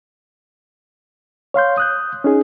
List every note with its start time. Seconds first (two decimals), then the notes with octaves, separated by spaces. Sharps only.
1.54 C#5 F5 C6 G6
1.78 D#6 F#6 G6
2.24 C#4 D#4 G#4